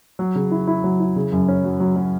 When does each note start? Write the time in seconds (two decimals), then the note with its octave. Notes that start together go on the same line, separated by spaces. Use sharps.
0.19 F#3
0.35 C#3
0.51 E4
0.67 E4
0.84 F#3
1.00 E4
1.16 C#3
1.32 F#2
1.48 C#4
1.64 F#3
1.80 F#3
1.96 F#3